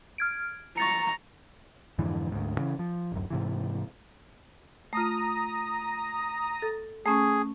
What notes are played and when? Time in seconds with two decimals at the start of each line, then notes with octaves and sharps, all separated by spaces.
0.18 F6 G#6 D7
0.78 A#5 C#6 A6 C#7
1.98 F2 G#2 D3 E3
2.32 D2 G#2
2.59 C#3 E3
2.79 F3
3.12 D1 F#2
3.30 G#2 C3 E3
4.93 A3 F4 A#5 D#6 A#6
6.62 A4
7.06 A3 C#4 G#4 C#6